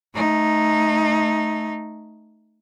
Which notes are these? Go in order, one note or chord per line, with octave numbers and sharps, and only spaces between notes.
A3 D#4